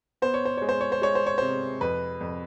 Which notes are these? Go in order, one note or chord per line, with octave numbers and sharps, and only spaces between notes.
B3 C5
C#5
C5
G#3 C#5
C5
C#5
C5
G#3 C#5
C5
C#5
C3 C5
F2 B4
F2